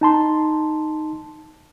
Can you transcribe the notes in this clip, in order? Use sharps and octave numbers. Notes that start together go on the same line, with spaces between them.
D#4 A5 C6